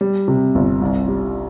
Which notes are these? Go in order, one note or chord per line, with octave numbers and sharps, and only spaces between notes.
G3
C3
G1
C2
G3